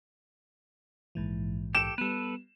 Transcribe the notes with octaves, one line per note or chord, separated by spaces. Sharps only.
A#1 G#2 E3
G4 A4 E7
G3 B3 A4 B4